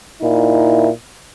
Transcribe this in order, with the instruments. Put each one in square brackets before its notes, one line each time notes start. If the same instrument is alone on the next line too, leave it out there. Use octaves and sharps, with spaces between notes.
[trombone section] A#2 D#4 E4